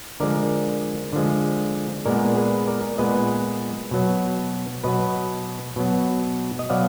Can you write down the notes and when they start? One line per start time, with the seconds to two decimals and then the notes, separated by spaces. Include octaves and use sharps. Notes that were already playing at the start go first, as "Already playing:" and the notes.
0.20 D3 F3 G#3 A#4 D5
1.13 D3 F3 G#3
2.06 A#2 G#3 B3 A#4 D5
2.36 G#4 B4
2.67 A#4 D5
2.98 A#2 G#3 B3 B4 D#5
3.91 B2 F#3 B3
4.84 B2 F#3 B3 B4 D#5
5.76 B2 F#3 B3
6.59 D#5
6.70 B2 F#3 B3 D5 F5